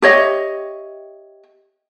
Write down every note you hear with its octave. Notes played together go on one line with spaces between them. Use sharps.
G4 C#5 D#5 E5